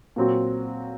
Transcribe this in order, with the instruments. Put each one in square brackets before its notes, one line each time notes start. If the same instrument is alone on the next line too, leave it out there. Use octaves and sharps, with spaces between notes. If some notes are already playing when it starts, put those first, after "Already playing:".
[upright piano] A#2 F#3 C4 F#4